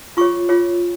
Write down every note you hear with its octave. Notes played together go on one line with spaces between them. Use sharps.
F4 G#4 C#5 C#6
F4 G#4 C#5